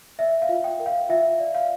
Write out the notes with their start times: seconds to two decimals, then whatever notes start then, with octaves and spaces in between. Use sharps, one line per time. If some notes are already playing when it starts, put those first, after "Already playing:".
0.19 D5 E5
0.42 F5
0.49 F4
0.64 G5
0.80 A#4
0.86 F5
1.09 F4 E5
1.40 D5
1.54 F5